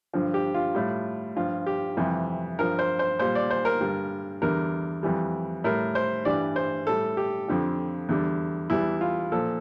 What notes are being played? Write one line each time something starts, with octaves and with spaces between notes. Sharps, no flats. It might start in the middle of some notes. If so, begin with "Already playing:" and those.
G2 D3 F3
G4
F4
A2 G3
G2 F3 F4
G4
F2 C3 E3 G3
G2 F3 A#4
C5
C5
A#2 G3 C5
D5
C5
A#4
G2 D3 G3
E2 D3 G3 A#4
F2 E3 G3
A2 G3 A#4
C5
G2 E3 G3 D5
C5
A2 G3 A4
G4
F2 D3 F3
E2 D3 G3
E2 E3 G3 E4
F4
A#2 F3 A4